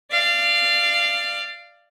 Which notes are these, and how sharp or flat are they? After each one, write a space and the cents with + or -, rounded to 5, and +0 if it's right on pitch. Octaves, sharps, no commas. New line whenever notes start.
D5 +15 F5 -15